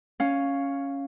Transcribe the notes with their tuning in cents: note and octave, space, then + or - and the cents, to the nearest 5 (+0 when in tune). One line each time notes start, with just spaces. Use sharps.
C#4 +0 F5 +5